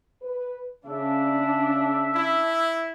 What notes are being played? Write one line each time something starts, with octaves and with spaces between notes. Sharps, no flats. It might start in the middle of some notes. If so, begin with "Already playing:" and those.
B4
C#3 D4 E5
E4